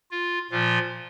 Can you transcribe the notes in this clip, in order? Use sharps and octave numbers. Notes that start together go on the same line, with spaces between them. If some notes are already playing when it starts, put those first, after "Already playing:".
F4
A#2 F3 F4